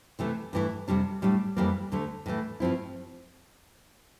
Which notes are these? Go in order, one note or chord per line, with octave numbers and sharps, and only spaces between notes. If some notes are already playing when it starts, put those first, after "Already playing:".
C3 E3 A3
G2 E3 A3 E4
F2 C3 G3 D4
A2 G3 D4
F2 E3 G3 A#3
D2 D3 A3
A2 E3 A3
G2 F3 C4 E4